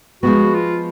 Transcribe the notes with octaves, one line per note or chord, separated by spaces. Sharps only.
F3 G#3 B3 F#4
F4